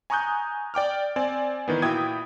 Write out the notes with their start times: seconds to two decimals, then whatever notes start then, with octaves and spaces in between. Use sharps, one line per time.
0.10 G#5 A#5 C#6 D#6 F#6 G6
0.74 D5 G5 D6 F6
1.16 C4 D5 G#5
1.68 D#3 E3 B3
1.82 A#2 E4 F#4 G5 D#6 G#6